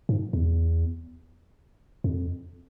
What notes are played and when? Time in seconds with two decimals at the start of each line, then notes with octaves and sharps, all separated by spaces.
0.09 G#2
0.33 E2
2.04 F2